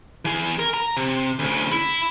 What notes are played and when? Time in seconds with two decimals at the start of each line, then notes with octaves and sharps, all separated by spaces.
0.25 E3 G#4
0.59 A#4
0.74 A#5
0.97 C3
1.39 D2 C#3
1.72 E4